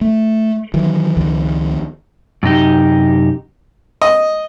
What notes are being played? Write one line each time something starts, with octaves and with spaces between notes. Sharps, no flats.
A3
D#3 E3 F#3
C#2 D#3 F3
F#2 C3 D#4 G4
D#5